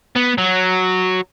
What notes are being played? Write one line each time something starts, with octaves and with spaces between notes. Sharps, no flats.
B3
F#3